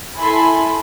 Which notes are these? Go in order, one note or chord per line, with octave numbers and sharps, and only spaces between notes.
E4 A4 G#5 B5 C6